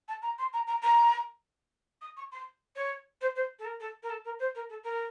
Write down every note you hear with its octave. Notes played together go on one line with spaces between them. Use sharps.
A5
A#5
C6
A#5
A#5
A#5
D#6
C#6
C6
C#5
C5
C5
A4
A#4
A4
A#4
A4
A#4
C5
A#4
A4
A#4